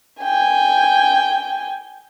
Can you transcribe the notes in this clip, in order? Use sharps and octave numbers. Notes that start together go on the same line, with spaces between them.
G5 G#5